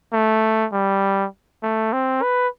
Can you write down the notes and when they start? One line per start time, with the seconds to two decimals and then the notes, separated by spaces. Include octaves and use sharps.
0.13 A3
0.73 G3
1.63 A3
1.93 C4
2.22 B4